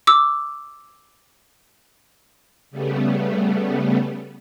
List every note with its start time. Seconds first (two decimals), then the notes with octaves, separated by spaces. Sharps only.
0.07 D6 E6
2.71 C#3 G3 A3 B3